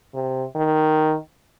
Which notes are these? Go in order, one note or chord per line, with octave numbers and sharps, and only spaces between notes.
C3
D#3